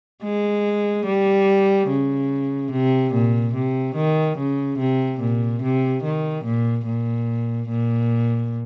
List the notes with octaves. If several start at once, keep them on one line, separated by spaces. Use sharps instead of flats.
G#3
G3
C#3
C3
A#2
C3
D#3
C#3
C3
A#2
C3
D#3
A#2
A#2
A#2